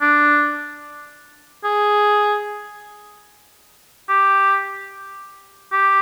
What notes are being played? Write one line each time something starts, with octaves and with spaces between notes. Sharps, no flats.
D4
G#4
G4
G4